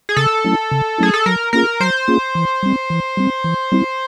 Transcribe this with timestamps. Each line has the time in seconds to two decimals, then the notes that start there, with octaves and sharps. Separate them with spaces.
0.09 G#4
0.16 C#3 A4
0.44 F#3 A3 C#4 E4
0.71 C#3
0.98 F#3 A3 C#4 E4 G#4
1.14 A4
1.26 F#3 A#4
1.53 A#3 C#4 F4 G#4 A#4
1.80 F#3 C5
2.08 A#3 C#4 F4 G#4
2.35 E3
2.63 G3 C4
2.90 E3
3.17 G3 C4
3.44 E3
3.72 G3 C4 E4